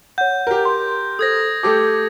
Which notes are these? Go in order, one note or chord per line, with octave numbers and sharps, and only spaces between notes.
C#5 F#5 G6
G4 A#4
C6
A4 C5 D#6 G#6 A#6
A3 G4 A4 D6